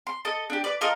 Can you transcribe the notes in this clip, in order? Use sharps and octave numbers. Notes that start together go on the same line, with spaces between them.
C6
A4 D#5
D4 G4
B4 D5
F4 A4 A#4 D#5